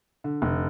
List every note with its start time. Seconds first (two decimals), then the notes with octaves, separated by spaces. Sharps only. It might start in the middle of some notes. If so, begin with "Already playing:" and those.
0.24 D3
0.42 F1